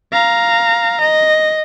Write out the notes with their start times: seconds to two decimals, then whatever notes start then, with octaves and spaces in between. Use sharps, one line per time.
0.12 F5 A#5
1.01 D#5